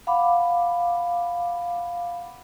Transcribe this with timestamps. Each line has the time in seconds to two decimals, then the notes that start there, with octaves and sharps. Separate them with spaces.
0.07 F5 F#5 B5 D6